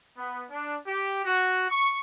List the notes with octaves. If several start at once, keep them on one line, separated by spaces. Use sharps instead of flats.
B3
D4
G4
F#4
C#6